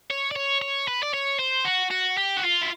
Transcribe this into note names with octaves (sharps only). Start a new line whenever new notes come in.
C#5
D5
C#5
C#5
B4
D5
C#5
C5
F#4
F#4
G4
F#4
F4
E4